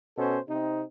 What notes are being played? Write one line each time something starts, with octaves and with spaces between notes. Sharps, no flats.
B2 C#4 A4 C5
C3 C4 D#4